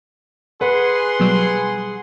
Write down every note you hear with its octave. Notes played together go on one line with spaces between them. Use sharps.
G#4 B4 F#5 C6
B2 F#3 G3